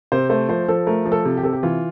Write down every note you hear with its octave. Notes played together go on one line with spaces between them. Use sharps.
C3 C5
A3 C5
F3 C5
F3 A4
A3 A#4
F3
A4
C3
G4
C3 A4
G4
E3 F4